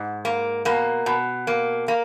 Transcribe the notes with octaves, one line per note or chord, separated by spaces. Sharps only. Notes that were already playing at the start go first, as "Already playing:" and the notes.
Already playing: G#2
A#3
B2 A#3
B2
A#3
A#3